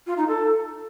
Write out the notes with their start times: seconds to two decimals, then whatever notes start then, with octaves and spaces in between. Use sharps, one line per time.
0.07 F4
0.17 D#4
0.28 A4